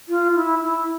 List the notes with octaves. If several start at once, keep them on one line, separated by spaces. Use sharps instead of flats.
F4
E4
E4